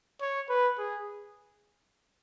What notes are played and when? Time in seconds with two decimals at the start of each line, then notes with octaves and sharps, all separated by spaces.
0.21 C#5
0.49 B4
0.79 G#4